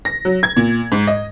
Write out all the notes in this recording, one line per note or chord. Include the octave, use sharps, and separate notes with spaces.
A#6
F#3
G#6
A#2
G#2
D#5